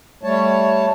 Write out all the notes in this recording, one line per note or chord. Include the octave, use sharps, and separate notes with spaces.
G3 A3 C#5 A5